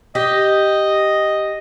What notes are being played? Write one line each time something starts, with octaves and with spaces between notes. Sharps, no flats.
G4 D#5